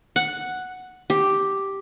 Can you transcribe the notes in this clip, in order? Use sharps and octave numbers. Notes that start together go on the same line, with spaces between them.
F#5
G4